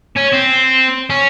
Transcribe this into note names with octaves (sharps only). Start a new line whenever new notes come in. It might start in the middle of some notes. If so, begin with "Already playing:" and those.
C#4
C4
C#4